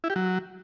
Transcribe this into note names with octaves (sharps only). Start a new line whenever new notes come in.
E4
G4
F#3